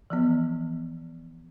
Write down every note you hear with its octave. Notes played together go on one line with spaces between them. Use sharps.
E3 F3 B3